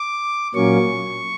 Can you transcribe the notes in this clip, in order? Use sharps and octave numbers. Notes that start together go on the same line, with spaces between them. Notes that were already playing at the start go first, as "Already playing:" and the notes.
Already playing: D6
A#2 F#3 A#3 C#4 C#6